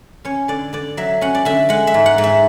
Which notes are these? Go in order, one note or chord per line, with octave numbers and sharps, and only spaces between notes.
C#4 C#5
D3 D5
D3 D5
F#3 E5
C#4 F#5
D5
D3 E5
G#3 F#5
E5
G#2
F#5
G#2
E5